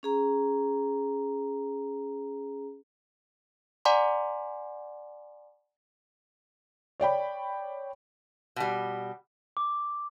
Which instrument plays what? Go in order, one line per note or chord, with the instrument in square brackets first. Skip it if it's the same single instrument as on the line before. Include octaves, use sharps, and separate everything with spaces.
[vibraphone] C#4 G#4 A#5
[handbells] D5 F#5 G#5 A#5 C6 D6
[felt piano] C#5 D5 G5 B5
[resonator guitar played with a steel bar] B2 G3
[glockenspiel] D6